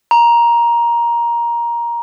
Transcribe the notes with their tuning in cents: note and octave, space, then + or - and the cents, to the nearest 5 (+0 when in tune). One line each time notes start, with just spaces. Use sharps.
A#5 +15